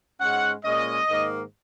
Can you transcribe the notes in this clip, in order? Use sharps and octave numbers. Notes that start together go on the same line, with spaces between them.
G#2 G#3 C#4 F#5
A#2 G#3 C#4 D#5
G#2 D#3 A#3